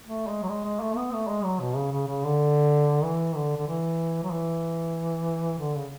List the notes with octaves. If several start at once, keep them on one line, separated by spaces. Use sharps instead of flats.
A3
G#3
F#3
G#3
G#3
A3
B3
A3
G#3
F#3
B2
C#3
C#3
C#3
D3
E3
D3
D3
E3
F#3
E3
D3
C#3